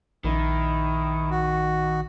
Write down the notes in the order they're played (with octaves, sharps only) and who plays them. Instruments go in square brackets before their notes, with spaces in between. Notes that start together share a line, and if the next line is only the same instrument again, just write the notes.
[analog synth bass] A#1 [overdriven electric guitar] D#3 [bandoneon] E4
[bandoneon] F#4